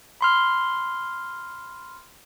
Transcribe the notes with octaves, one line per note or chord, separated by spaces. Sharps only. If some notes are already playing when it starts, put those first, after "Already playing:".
B5 C6 F6